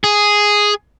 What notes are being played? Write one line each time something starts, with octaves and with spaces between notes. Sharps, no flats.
G#4